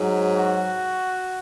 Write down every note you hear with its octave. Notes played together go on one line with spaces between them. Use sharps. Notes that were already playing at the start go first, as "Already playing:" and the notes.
Already playing: G#2 F#3
F#4